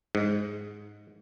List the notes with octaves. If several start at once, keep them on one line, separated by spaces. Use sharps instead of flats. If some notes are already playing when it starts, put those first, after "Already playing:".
G#2